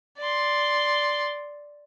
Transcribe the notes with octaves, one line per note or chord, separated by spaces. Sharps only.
D5 C6